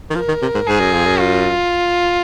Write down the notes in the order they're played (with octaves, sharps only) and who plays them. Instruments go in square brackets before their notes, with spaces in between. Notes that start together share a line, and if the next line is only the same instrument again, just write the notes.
[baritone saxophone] D#3
[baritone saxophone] F3 [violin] A#4
[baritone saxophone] D#3
C3
G#2
[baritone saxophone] G#2 [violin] G#4
[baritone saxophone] F#2
F2
F#2
[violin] F4